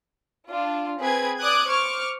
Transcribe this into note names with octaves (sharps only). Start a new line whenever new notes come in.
D4 F4
C4 G#4 B4 G#6
D5 D6 D#6 F#6 G#6
C5 C#6 D6 F6